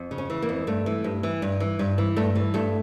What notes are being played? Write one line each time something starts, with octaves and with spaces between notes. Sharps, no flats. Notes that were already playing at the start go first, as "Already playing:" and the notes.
Already playing: F2
C#3
C#4
E3
A#3
F2
G2 A3
E3
G2
E3
G2
E3
G2
E3
G2 A3
E3
G2 A3